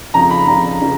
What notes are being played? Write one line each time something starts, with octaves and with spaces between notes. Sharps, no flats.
F2 C#3 F3 A#5
B5
F2 C#3 F3 A#5
C#3 F3